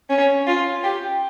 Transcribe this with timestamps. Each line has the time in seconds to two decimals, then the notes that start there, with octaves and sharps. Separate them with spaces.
0.09 C#4
0.47 F4
0.84 G4